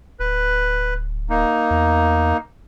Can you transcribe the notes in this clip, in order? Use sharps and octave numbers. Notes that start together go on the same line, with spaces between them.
D1 B4
A#3 D#4
E2